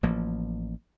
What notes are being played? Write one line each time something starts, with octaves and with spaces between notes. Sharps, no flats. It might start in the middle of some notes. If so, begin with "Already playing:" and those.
A1 F3 A#3